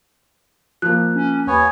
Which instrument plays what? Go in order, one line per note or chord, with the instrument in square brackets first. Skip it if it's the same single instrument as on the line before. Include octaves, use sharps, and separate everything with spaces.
[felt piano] F3 A#3 [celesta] F#6
[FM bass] C#4
[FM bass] D#2 [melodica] B3 C#5 G#5